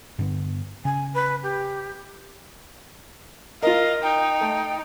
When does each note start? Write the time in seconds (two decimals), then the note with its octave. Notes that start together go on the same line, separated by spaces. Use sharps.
0.19 G2 D3 B3
0.85 C#3 G#5
1.14 B4
1.43 G4
3.63 F4 A#4 D#5 F5
4.02 D#4 G5
4.41 A3